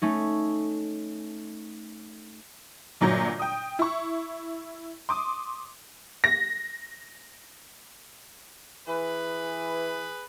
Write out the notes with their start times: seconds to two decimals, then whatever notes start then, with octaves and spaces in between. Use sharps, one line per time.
0.02 A3 C#4 D#4
3.01 G1 A#2 F#3 G6 A#6
3.39 G5 D#6
3.79 E4 C#6
5.09 C6 D6 D#6
6.24 A#6
8.87 E3 G#4 B4